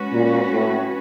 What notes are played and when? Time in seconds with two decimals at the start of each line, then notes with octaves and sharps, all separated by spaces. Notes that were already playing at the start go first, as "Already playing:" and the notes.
Already playing: G#3 C#4 F#4 B4
0.13 A#2
0.52 A2